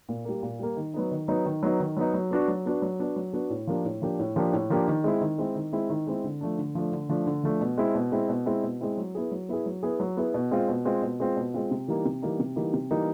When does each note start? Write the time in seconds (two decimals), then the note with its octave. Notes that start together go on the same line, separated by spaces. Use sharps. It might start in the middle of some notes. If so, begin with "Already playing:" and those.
0.09 A#2
0.25 G3 A#3
0.43 A#2
0.59 G3 A#3
0.77 D#3
0.94 F#3 B3 D#4
1.11 D#3
1.28 F#3 B3 D#4
1.45 D#3
1.63 F#3 B3 D#4
1.80 D#3
1.97 F#3 B3 D#4
2.14 F#3
2.31 B3 D4 F#4
2.48 F#3
2.66 B3 D4 F#4
2.82 F#3
2.99 B3 D4 F#4
3.16 F#3
3.33 B3 D4 F#4
3.50 A2
3.67 F3 A#3 D4 G4
3.85 A2
4.02 F3 A#3 D4 G4
4.19 A2
4.36 F3 A#3 D4 G4
4.53 A2
4.70 F3 A#3 D4 G4
4.88 D#3
5.04 G#3 C4 E4
5.21 D#3
5.38 G#3 C4 E4
5.56 D#3
5.73 G#3 C4 E4
5.90 D#3
6.07 G#3 C4 E4
6.24 D3
6.41 F3 A3 D4
6.58 D3
6.75 F3 A3 D4
6.92 D3
7.09 F3 A3 D4
7.26 D3
7.44 F3 A3 D4
7.61 B2
7.78 G#3 C4 E4
7.95 B2
8.12 G#3 C4 E4
8.29 B2
8.46 G#3 C4 E4
8.63 B2
8.81 G#3 C4 E4
8.98 F#3
9.15 B3 E4 G#4
9.31 F#3
9.49 B3 E4 G#4
9.66 F#3
9.83 B3 E4 G#4
10.00 F#3
10.17 B3 E4 G#4
10.34 B2
10.51 G#3 C4 F4
10.68 B2
10.85 G#3 C4 F4
11.02 B2
11.20 G#3 C4 F4
11.37 B2
11.54 G#3 C4 F4
11.71 C3
11.88 E3 G3 A#3 D#4
12.05 C3
12.22 E3 G3 A#3 D#4
12.39 C3
12.56 E3 G3 A#3 D#4
12.73 C3
12.91 E3 G3 A#3 D#4